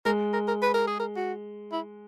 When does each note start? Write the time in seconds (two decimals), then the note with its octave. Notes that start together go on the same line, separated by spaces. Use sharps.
0.05 G#3 A#4
0.33 A#4
0.48 A#4
0.62 B4
0.74 A#4
0.87 G#4
0.99 A#4
1.16 F#4
1.72 E4